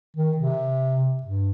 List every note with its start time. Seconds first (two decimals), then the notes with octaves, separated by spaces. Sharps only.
0.17 D#3
0.38 C3
1.23 G2